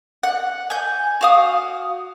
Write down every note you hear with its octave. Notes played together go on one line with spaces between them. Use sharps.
F#5
G#5 G6
F#4 F5 D#6